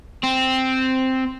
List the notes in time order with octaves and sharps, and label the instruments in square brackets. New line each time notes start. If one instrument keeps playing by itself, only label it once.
[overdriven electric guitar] C4